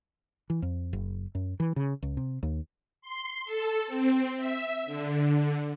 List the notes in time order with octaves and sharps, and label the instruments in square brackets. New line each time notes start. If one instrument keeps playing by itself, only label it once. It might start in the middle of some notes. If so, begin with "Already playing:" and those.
[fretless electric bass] E3
F2
F#1
F#2
E3
C#3
C#2
C3
D#2
[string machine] C6
A4
C4
E5
D3